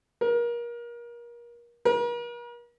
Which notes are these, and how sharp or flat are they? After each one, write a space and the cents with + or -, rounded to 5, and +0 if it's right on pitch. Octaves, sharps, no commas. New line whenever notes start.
A#4 +30
A#4 +45